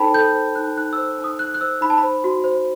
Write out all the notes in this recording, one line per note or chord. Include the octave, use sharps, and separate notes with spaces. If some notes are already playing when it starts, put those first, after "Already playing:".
Already playing: D#4 A4 C5 G5 A5 B5
A4 G6
C5
D#4 F#6
D#4 F#6
C5 E6
D#4
D#6
D#4 F#6
F#6
C5 E6
D#4 B5
A5
B5
C5
F#4
C5